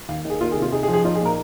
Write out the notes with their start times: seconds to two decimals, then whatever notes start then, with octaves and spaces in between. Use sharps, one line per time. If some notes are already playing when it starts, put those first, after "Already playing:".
0.09 D#2 F5
0.25 D#3 G#4
0.41 A#3 F4
0.52 G#4
0.56 C3
0.62 F4
0.72 D#4 G#4
0.83 G#4
0.88 F3
0.93 G#4
1.05 D#4 F4
1.15 G#4
1.21 A#2 A#4